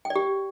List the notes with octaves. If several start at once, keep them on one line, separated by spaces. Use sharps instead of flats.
G5
D5
G4